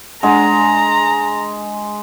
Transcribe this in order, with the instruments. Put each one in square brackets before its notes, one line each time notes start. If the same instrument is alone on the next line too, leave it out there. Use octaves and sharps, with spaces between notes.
[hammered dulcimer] G#3 [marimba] D4 F#5 [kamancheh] A#5